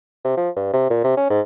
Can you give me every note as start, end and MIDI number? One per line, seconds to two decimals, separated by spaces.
0.25 0.35 48
0.37 0.49 53
0.57 0.72 43
0.73 0.85 48
0.90 1.01 46
1.04 1.16 48
1.17 1.28 61
1.30 1.41 44